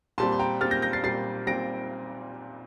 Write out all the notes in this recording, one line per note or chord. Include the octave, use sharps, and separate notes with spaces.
A#2 G3 C4 A5 C6
C6
G5 A#5
A#2 G3 C4 F6 A6
G6 A#6
G6 A#6
A6 C7
A#2 G3 C4 A6 C7
A#2 G3 C4 A#6 D7